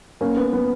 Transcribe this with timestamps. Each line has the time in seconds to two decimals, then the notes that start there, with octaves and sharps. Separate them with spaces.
0.21 A#3 C#4
0.37 B3
0.53 B3